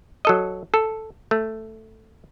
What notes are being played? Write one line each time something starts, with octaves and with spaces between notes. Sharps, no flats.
F#3 A4 D#5
A4
A3